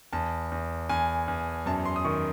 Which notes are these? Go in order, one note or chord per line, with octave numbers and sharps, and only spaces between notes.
E2 A5
E2
E2 G#5
E2
F#2 A5
C6
D#6
D#3 C#6